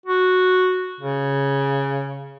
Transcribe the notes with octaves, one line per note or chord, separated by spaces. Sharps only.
F#4
C#3